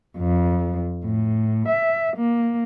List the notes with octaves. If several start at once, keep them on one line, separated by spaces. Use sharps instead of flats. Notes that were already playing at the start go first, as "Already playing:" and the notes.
F2
A2
E5
A#3